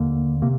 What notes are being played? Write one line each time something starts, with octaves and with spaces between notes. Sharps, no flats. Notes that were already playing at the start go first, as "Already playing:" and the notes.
Already playing: D#2 D3 A#3
C3 A#3